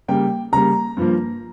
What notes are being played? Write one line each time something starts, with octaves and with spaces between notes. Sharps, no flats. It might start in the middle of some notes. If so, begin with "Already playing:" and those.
C#3 G3 A#3 G5
C#3 G3 A#3 A#5
G2 F3 A#3